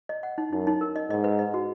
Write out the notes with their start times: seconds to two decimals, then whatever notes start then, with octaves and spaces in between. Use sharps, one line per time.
0.09 D#5
0.23 F#5
0.38 D#4
0.52 F#2 D#4
0.67 D#4
0.81 A#4
0.96 D#5
1.10 G#2 D#5
1.24 B4
1.39 D#5
1.54 F#4